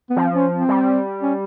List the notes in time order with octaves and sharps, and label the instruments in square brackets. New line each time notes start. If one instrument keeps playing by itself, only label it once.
[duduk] B3
[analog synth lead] F3 [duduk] C4
[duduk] C#4
C4
[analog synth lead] G3
[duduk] C#4